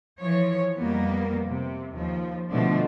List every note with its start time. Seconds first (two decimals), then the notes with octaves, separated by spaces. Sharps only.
0.18 E3 F3 C#5
0.76 F2 G3 A#3 B3
1.45 C3
1.92 D#2 F3
2.50 B2 D3 F3 G3 A3 D4